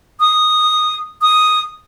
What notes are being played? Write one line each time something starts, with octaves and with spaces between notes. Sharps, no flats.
D#6
D#6